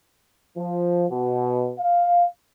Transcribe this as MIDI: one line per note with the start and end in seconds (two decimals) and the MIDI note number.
0.57 1.06 53
1.10 1.73 47
1.79 2.25 77